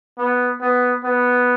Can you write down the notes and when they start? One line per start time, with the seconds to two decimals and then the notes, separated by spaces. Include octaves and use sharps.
0.18 B3
0.61 B3
1.04 B3